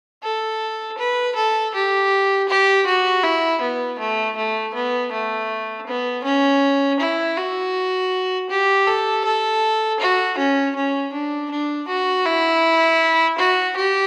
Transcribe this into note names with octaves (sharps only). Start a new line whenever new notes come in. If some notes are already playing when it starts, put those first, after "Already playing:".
A4
B4
A4
G4
G4
F#4
E4
B3
A3
A3
B3
A3
B3
C#4
E4
F#4
G4
A4
A4
F#4
C#4
C#4
D4
D4
F#4
E4
F#4
G4